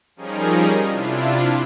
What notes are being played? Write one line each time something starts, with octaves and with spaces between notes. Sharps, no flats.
F3 G3 C#4 D#4 G#4 A#4
C3 D4 E4 F4